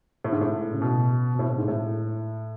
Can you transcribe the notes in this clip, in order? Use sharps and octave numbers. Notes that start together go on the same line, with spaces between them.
A2
G#2
A2
C#3
B2
B2
A2
A2
G#2
A2